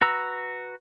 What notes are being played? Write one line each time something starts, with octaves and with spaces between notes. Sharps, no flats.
F#4 B4 A#5 E6